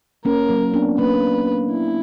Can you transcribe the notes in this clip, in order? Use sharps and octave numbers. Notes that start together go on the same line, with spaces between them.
A#3 C#4 A#4
F#3 A#3
B3 D4
A#3 C#4 B4
E4